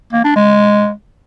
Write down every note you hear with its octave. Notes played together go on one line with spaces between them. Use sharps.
A#3
D4
G#3